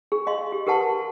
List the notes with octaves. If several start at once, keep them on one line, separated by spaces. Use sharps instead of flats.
G#4
D#5 F5 C6
G4
G4 A#4 B4 F#5 A5 C6